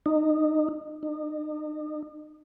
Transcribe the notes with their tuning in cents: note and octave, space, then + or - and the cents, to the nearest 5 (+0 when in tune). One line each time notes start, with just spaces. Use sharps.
D#4 -20
D#4 -40